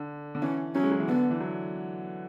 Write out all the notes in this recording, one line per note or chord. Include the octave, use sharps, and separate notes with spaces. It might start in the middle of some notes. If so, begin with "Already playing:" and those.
Already playing: D3
D3
E3 C#4
F#3 C#4
G#3
F#3
E3
D3 B3
E3
F#3